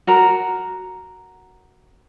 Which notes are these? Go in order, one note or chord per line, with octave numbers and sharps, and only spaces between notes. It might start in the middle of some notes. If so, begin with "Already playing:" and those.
F#4 A#4 A#5